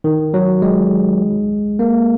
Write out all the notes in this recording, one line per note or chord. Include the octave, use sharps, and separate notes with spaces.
D#3
F#3
G#3
A#3